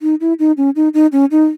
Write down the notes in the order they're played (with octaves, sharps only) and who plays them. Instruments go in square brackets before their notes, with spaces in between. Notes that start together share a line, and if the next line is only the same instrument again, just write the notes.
[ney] D#4
E4
D#4
C#4
D#4
D#4
C#4
D#4